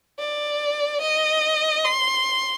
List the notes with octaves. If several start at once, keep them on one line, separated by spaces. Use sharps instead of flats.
D5
D#5
C6